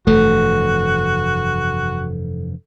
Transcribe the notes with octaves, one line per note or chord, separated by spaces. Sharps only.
F1 G2 E3 A3 F#4 A4